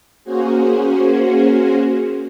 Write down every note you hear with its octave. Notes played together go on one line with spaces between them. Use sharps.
A#3 C#4 F#4 G#4 C5